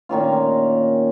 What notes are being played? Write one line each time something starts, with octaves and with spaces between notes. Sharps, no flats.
A#2 D#3 C#4 F4